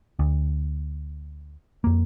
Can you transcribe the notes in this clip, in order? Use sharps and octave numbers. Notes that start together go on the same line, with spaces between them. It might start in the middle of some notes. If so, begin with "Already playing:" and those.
D2
F2 A#3